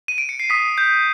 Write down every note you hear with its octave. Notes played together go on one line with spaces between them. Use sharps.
D#7
D7
C#7
C7
D#6 B6
G6